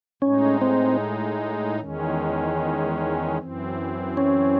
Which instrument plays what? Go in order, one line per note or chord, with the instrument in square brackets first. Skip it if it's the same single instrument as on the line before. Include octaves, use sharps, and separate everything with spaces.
[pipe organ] A2 G#3 D#4 [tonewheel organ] C#4
[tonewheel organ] C4
[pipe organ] E2 D#3 G#3 C#4
F#2 E3 C4
[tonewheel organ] C#4